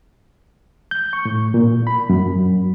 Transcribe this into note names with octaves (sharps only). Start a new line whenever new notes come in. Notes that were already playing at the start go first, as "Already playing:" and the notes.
G6
C#6
A2
A#2
B5
F#2